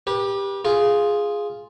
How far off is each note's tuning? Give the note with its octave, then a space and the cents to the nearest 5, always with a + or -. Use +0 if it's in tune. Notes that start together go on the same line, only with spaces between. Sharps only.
G4 +15 B4 -30
F4 +0 G#4 +0